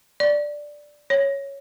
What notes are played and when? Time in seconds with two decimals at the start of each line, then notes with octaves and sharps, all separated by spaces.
0.20 D5
1.10 C#5